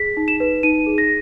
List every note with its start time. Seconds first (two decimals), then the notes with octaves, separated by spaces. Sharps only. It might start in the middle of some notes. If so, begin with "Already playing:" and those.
Already playing: G#4 B6
0.17 D#4
0.28 E7
0.40 B4
0.63 D#4 D#7
0.87 G#4
0.98 A#6